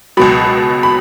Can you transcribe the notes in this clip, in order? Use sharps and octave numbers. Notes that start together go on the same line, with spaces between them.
C#2 B2 F#3 B5
B5